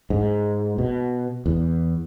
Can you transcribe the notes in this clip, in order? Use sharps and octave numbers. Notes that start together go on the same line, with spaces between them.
G#2
B2
E2